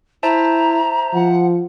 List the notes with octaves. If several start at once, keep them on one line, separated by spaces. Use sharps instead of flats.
E4 C5 E5 A5 A#5
F3 F#5